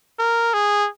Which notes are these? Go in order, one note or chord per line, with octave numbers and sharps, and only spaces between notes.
A#4
G#4